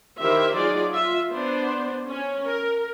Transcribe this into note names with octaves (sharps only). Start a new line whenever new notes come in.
D#3 E4 G4 A#4 C5 E5
F#3 D#4 F4 G#4 D5
F4 E5
B3 D4 C5
C#4
A#4